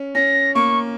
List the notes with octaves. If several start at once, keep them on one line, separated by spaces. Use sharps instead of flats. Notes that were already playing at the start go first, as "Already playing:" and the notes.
Already playing: C#4
C#4 A#6
A#3 C#6